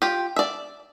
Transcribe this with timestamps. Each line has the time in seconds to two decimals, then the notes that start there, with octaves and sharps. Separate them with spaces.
0.02 F4 G4
0.36 D5 E5